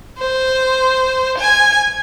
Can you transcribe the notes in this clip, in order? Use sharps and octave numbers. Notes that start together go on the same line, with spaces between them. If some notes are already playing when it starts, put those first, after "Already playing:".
C5
G#5